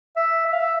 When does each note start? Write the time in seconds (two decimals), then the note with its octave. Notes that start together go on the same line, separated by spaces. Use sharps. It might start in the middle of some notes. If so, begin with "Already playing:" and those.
0.16 E5
0.46 E5
0.52 F5
0.60 E5